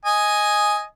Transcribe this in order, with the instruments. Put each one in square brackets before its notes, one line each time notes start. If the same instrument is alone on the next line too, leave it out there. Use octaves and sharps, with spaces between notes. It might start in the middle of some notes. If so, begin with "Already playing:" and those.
[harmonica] D#5 G#5